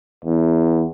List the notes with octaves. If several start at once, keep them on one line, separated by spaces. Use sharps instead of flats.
E2